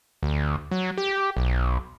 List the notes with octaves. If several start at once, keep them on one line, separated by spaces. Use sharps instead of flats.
D2
F#3
G4
B1